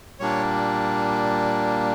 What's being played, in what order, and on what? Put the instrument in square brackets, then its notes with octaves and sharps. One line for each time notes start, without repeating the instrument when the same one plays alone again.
[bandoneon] A#2 G3 A#3 D4 C#5